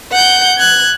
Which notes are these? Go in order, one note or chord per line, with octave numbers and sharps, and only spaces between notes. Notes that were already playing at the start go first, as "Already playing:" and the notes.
F#5 G6
F#6 G#6